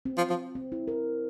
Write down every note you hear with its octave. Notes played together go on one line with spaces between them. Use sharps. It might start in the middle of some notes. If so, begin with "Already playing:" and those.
C4
F3
F3
C4
E4
A#4